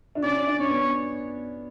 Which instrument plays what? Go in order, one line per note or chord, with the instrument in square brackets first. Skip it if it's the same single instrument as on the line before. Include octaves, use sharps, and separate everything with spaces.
[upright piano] D4
[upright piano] C#4 [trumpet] D5
[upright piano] C#4
D4
[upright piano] C#4 [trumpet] C#5
[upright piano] B3